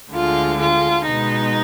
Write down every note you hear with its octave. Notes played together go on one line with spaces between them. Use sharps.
D2 D3 G#3 F4
F4
B2 G#3 B3 D#4